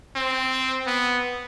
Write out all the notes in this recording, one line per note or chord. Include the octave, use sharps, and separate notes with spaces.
C4
B3